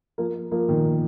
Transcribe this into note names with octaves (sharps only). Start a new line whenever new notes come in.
F3 A#3
F3 A#3
A#2 D#3